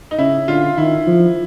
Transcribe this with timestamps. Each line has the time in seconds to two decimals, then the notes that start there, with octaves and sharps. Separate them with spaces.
0.11 D#4
0.18 C#3 E4
0.48 D3 F4
0.78 D#3 E4
1.07 F3